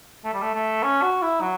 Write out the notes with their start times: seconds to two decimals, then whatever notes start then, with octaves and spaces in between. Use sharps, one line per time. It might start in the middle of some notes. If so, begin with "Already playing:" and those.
0.25 A3
0.34 G3
0.42 A3
0.54 A3
0.83 C#4
1.02 F#4
1.22 E4
1.41 F#3